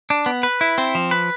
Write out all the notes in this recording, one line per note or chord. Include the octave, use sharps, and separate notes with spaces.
D4
B3
B4
E4
C4
F3
B4